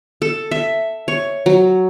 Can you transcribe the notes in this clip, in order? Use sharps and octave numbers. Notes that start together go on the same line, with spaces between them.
A4
E5
C#5
F#3